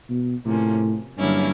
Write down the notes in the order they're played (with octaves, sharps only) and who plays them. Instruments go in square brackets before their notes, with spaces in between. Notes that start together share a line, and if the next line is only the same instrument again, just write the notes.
[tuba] B2
[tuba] A2 [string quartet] C3 F3 A#3 C#4
[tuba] G2 [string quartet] D3 F#3 A#3 C#4 E4